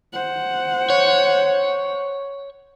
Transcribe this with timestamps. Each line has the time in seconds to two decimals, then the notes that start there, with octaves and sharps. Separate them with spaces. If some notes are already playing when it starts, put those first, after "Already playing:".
0.13 C5 F#5
0.90 C#5